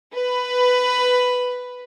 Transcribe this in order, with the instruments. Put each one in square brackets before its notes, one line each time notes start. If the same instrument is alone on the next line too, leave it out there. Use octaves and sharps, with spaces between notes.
[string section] B4